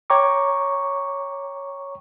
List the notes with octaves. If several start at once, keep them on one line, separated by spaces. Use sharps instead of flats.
C#5 G5 A#5 C#6 D6